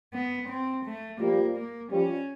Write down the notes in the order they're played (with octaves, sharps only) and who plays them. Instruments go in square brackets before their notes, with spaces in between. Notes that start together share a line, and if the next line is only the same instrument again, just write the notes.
[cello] B3
C4
A3
[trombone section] F3 G3 [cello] A#3
[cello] A#3
[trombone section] F3 G3 [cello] C#4